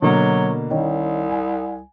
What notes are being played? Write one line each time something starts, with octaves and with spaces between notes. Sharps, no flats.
B2 D3 F#3 A#3
C2 D#3 C#4 D#4
G#5